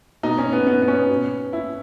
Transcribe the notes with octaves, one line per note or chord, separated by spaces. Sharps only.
B2 D#4
C#4
B3
B3
B3
C#4
B2
E4